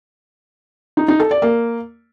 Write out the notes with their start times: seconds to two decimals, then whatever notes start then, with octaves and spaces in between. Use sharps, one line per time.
0.97 D#4
1.08 D#4
1.20 A4
1.31 D5
1.42 A#3